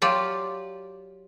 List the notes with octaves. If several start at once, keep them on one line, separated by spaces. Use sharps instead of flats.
F#3 F4 G4 D5